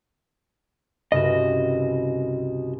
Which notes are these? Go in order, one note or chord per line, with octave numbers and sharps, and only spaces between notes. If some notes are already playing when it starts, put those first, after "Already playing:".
C2 G2 C#3 F#4 D#5